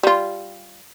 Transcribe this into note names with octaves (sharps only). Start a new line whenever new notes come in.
G3 F4